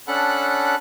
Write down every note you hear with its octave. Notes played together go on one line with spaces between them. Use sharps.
C#4 D4 A4 F#5 B5 F#6